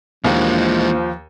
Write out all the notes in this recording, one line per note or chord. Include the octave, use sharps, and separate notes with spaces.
D#2 E3 F3 G#3 A#3 D4 C5